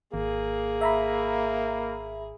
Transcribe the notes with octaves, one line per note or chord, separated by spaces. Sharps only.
G#1 A#3 G#4
E5 A#5 B5